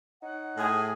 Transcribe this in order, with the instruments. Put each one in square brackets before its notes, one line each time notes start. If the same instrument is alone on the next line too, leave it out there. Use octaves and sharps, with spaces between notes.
[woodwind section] D#4 C#5 F#5
[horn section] A2 G#4